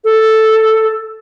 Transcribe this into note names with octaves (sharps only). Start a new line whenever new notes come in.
A4